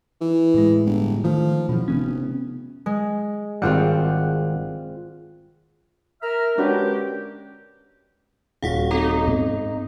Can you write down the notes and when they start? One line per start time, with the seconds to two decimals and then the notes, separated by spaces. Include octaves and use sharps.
0.21 E3
0.54 A2 G#3
0.86 G1
1.24 D#3 F3 A3
1.69 F#1 B2 F3
1.88 F1 C3 B3 C#4
2.86 G#3
3.62 G#1 G3 C4 F4 F#5
6.22 A#4 E5 A#5 F6
6.58 G#3 C#4 D4 F#4 G4 B4
8.63 D#1 F4 F#4 F5 F#5 B6
8.91 C4 D#4 A4 A#5
9.27 G#2 C3 B3 C#4